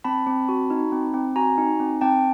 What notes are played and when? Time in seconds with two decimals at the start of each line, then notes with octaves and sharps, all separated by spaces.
0.04 C4 A5 B5
0.27 C4
0.49 F#4
0.70 D#4
0.92 C4
1.14 C4
1.36 F#4 G#5 A#5
1.58 D#4
1.80 C4
2.01 C4 G5 A5